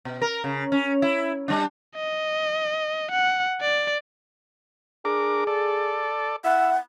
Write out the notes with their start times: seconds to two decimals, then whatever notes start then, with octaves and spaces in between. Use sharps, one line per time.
0.05 B2
0.22 A#4
0.44 C#3
0.72 C#4
1.02 E4
1.48 G3 D4
1.96 D#5
3.12 F#5
3.61 D5
5.05 D4 G#4 A#4 D6
5.47 A4 D5
6.44 E4 E5 F#5